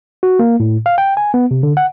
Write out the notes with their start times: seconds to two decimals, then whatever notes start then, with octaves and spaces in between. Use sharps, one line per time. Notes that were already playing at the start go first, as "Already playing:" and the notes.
0.23 F#4
0.39 A#3
0.60 A2
0.86 F5
0.98 G5
1.17 G#5
1.34 B3
1.51 C3
1.63 D3
1.77 F#5